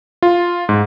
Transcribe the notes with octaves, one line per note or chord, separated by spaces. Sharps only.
F4
G#2